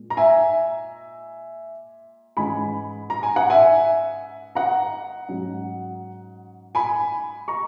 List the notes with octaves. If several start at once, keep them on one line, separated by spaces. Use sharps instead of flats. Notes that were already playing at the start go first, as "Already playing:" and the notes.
Already playing: A#2 G#3
A#5
E5 G#5
G#2 E3 G#3 C#4 G#5 B5
A#5
G#5
F#5
E5 G#5
F#5 A#5
G#2 F#3 C#4
G#5 B5
A#5 C#6